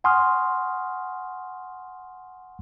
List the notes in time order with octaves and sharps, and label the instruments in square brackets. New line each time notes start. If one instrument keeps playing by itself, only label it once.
[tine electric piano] F#5 G#5 C6 C#6 D#6 F6